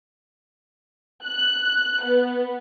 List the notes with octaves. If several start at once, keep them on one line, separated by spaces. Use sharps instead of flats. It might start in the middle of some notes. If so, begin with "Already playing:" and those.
F#6
B3